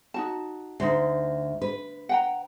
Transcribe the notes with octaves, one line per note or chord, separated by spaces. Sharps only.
D#4 F#4 A5
D2 D#4 C5
B4
F#5 G5 A#5